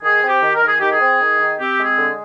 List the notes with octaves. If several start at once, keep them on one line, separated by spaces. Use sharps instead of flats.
D#3 G#4
C4
G4
D#3
A#4
D#3
G#4
D#3 G4
G#4
C4
D#3
D#3
C4 G4
G#3
G#4
D3